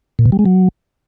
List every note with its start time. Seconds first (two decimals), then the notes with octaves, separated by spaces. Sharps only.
0.19 A#2
0.26 B2
0.32 G3
0.39 G#3
0.46 F#3